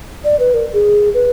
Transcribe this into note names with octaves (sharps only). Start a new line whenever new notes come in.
D5
B4
A#4
G#4
B4